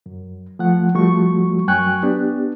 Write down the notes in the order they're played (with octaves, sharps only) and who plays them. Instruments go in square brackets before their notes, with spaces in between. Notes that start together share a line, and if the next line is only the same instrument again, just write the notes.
[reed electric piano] F#2
F3 A3 F#5
F3 G3 A3 F#4 C#6
F#2 F#3 G5 G#5 C#6 F#6
B3 D4 G4